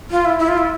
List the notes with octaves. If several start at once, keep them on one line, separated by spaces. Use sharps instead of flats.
F4
E4
E4
F4
E4